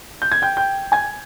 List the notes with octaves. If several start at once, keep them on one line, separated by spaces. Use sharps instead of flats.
G6
G#6
G5 G6
G5 G6
G#5 G#6